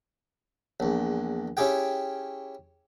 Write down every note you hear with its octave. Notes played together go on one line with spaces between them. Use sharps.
A#1 E2
C#4 E4 G4 G#4 G5